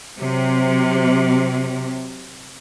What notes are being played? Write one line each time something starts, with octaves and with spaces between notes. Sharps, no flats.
C3 F#3